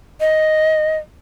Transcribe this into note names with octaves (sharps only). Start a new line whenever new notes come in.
D#5